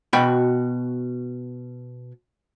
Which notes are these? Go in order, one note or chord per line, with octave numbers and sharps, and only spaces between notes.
B2 F#4 G5 B5